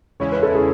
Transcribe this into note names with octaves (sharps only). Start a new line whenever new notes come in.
E2 C#3 G#3 C#4 E4 C#5
B4
A4
G#4